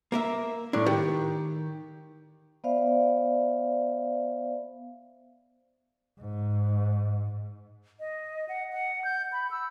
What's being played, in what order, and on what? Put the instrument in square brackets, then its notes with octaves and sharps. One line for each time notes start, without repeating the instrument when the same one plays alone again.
[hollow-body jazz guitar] A#3 A#4 E5
[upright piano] A2 [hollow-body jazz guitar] D4
[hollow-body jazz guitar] D#3 [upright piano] G4
[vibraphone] B3 C5 D5 E5 F5
[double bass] G#2
[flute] D#5
F#5
F#5
G6
B5
E6